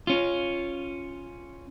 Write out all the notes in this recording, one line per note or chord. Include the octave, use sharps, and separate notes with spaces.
C#4 F4